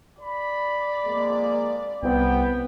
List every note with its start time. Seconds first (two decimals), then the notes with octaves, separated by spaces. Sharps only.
0.22 D5 B5
1.05 F2 G#3 A#3
2.03 C2 B3 G5